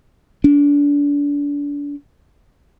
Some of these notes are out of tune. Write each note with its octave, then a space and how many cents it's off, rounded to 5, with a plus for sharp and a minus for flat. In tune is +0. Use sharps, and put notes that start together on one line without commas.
D4 -30